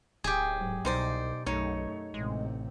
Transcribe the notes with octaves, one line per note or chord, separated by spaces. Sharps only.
D1 G4 G#4
G#2 F#3
C2 B2 D#4 C5 D5
B1 F#2 A3 D#4 C#5
A1 C3 G#3